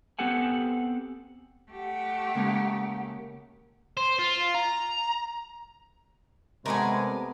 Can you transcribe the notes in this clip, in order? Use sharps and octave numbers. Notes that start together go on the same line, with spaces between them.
B3 C4 G4 A4 F#5 G#5
A3 G4 F#5
C#3 G#3 A#3
C5
F4
A#5
C3 G#3 A3 B3 A#4 D5 G#5